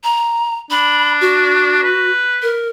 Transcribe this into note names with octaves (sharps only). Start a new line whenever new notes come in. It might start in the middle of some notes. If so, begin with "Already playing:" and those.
A#5
D4 B5
F#4
B4
A#4